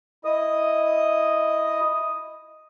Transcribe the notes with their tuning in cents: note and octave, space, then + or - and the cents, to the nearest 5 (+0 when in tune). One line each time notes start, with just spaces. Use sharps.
E4 -5 D#5 +0 D#6 +0